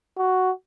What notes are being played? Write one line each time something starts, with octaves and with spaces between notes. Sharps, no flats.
F#4